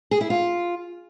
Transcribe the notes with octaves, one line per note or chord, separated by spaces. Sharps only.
G#4
E4
F4